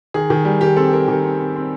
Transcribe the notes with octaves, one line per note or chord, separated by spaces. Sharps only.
D#3 G#4
D#3
G3
D#3 G4
C4 A4
C4 A#4
D#3
C4
C4
C4